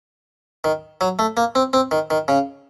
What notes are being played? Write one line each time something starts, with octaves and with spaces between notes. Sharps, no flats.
D#3
F#3
A3
A#3
C4
C4
D#3
D#3
C#3